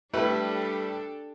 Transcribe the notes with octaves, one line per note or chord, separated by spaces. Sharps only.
G3 A3 D4 E4 G4 A4 B4